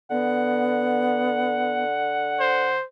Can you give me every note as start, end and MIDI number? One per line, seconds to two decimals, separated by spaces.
0.11 2.78 50
0.11 1.84 59
0.11 2.75 78
2.40 2.84 72